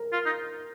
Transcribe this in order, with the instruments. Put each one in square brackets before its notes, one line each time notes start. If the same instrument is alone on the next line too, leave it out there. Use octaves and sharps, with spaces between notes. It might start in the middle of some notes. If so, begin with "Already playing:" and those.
Already playing: [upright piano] A#4
[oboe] F4
D#4